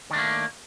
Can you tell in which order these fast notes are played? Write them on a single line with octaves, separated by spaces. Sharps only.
D#3 D4 A3 A#3